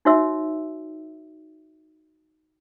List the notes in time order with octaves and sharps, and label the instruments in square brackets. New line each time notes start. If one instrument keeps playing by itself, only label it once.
[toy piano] D#4 F#4 C#5 E5 E6